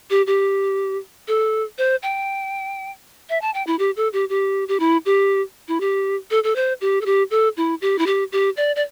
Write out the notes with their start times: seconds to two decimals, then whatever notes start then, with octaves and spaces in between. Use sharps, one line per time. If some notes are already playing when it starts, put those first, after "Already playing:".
0.10 G4
0.27 G4
1.28 A4
1.78 C5
2.03 G5
3.29 E5
3.41 A5
3.54 G5
3.67 E4
3.79 G4
3.96 A4
4.13 G4
4.29 G4
4.68 G4
4.80 E4
5.06 G4
5.68 E4
5.80 G4
6.31 A4
6.44 A4
6.55 C5
6.81 G4
7.01 A4
7.06 G4
7.31 A4
7.57 E4
7.81 G4
7.98 E4
8.06 G4
8.32 G4
8.57 D5
8.76 D5